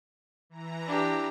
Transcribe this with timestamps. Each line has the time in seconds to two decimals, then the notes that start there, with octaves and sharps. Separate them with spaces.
0.50 E3 A#5
0.87 D4 G4